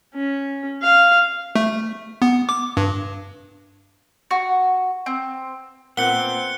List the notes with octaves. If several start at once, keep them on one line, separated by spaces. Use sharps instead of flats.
C#4
F5
A3
B3
D6
G2
F#4
C4
A#2 B3 C4 F#5 F#6 C#7 G7